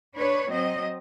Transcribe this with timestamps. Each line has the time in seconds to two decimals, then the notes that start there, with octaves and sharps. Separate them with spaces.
0.17 D4 B4 C#5
0.49 F#3 C4 D#5